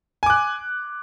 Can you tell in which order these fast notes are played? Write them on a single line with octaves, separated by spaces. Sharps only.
G#5 D6 F#6